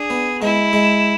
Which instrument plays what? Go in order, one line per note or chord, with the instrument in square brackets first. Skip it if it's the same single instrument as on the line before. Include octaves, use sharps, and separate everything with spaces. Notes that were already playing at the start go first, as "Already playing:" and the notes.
Already playing: [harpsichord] D4 [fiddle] G#4
[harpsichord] B3
[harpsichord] G#3 [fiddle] E4
[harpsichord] G#3